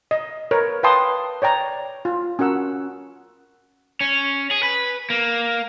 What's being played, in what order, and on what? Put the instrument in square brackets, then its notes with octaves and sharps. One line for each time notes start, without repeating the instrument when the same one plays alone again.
[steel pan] D#5
A#4 B4 C#5
B4 F5 G5 A5 C6 D#6
C#5 D5 G5 A#5
F4
C#4 F#4 A#4 F#5 E6
[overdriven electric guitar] C#4
G#4
B4
A#3